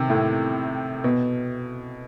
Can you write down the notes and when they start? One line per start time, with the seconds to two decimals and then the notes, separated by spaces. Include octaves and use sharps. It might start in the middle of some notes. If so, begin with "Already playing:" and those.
Already playing: C3 D#3
0.10 A2
1.04 B2